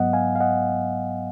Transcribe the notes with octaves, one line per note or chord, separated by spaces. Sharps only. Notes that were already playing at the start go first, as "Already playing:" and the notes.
Already playing: G#2 F#3 B3 D#5 F#5
F5 G#5
F5
D#5 F#5